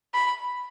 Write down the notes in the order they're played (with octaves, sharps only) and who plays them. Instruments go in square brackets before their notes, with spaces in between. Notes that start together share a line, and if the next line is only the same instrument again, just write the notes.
[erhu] B5